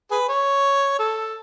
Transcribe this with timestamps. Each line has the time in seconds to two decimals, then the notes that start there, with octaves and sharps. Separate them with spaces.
0.11 G#4 B4
0.29 C#5
0.99 A4